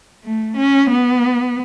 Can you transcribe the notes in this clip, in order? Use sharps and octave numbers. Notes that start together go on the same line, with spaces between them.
A3
C#4
B3